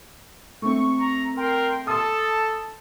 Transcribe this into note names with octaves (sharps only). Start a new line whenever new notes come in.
A3 C4 C#6
A#5
A#4 G5 C6
A4 A5 C6 D#6